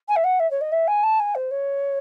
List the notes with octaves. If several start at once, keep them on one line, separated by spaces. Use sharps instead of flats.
G#5
E5
F#5
E5
C#5
D#5
E5
G#5
A5
G#5
C5
C#5